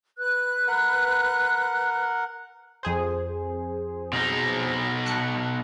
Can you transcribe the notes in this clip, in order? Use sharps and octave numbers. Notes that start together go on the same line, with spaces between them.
B4 F#6
A#4 F#5
F2 G#4 C5
B2 D#4
A5 F#6 C#7